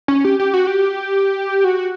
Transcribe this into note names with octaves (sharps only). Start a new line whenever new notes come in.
C#4
G4
G4
F#4
G4
F#4